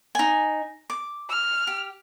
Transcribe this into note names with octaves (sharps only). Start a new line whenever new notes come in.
D#4 G#5
D6
F6
G4